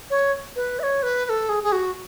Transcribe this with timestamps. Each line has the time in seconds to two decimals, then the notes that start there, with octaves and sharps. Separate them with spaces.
0.10 C#5
0.56 B4
0.79 E5
0.83 C#5
1.03 B4
1.25 B4
1.29 A4
1.49 G#4
1.63 G#4
1.72 F#4